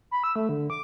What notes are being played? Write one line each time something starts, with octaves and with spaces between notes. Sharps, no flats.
B5
E6
A3
D3
D6